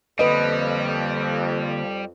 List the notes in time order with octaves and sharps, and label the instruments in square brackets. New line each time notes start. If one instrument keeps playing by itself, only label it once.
[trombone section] F2 [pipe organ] D3 A#3 [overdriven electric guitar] G3 [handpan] B4 D#5